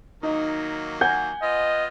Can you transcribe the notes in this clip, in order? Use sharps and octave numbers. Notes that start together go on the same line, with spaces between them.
D#3 F#3 A#3 D#4
F#5 G#5 G6
B3 F4 D#5